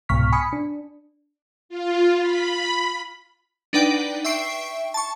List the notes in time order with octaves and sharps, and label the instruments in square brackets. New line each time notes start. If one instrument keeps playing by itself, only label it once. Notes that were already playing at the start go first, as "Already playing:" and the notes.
[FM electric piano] C2 G#2 B2 C#6 F6 B6
G#5 B5 D#6 B6 C#7
D4
[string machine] F4
B5
[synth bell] D4 D#4 B4 D5 F#5 G5
E5 G5 C#6 C7 D7
A5 C#6